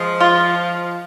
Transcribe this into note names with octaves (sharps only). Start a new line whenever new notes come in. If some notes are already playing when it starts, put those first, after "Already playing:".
Already playing: F3 G#3
F4